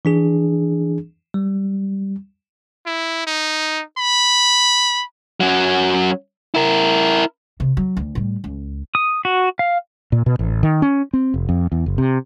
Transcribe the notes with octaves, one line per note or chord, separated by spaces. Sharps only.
E3 D4 G#4
G3
E4
D#4
B5
F#2 F#3
E4 A#4
C3
F#3
D2
A2 G3
C#2
D#6
F#4
F5
A#2
B2
A1
D#3
C#4
C4
F1
F2
E2
F#1
C3